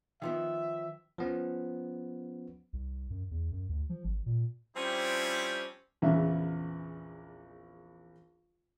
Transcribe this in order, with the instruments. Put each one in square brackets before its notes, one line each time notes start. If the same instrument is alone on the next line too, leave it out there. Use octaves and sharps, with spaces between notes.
[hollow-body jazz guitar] D#3 F3 B3 [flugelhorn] E5
[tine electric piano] F3 B3 C#4
[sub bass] C2
F#2
E2
F#2
D2
F3
G#1
A#2
[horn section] F3 G3 C4 C#4 E4 G4
[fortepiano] A#1 E2 C#3 B3 E5